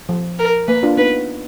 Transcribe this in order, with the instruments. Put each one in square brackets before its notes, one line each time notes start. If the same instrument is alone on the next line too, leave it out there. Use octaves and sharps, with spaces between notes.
[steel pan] F3
[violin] A#4
[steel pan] A#3 [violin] B4
[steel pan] D4 F4
[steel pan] B3 D#4 [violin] B4